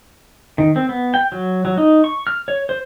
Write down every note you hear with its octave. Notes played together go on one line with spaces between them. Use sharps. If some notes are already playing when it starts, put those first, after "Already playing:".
D#3
C4
B3
G5
F#3
F#3
D#4
C#6
F6
C#5
C5